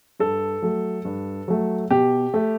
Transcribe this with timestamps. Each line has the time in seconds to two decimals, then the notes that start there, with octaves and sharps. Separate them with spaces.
0.20 G2 A4
0.62 F#3 A3
1.05 G2
1.48 F#3 A3
1.91 B2 G4
2.34 A3